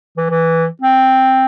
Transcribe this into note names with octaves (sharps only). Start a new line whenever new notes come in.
E3
E3
C4